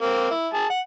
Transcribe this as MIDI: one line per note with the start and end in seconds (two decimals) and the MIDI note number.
0.01 0.30 58
0.01 0.30 60
0.31 0.48 64
0.54 0.66 68
0.54 0.66 81
0.70 0.80 78